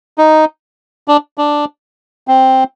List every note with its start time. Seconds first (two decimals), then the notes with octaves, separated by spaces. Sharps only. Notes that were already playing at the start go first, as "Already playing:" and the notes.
0.18 D#4
1.08 D4
1.38 D4
2.28 C4